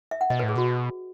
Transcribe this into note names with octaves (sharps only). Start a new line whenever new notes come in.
E5
F#5
B2 D#5
B4
A2
G#4
B2 F#4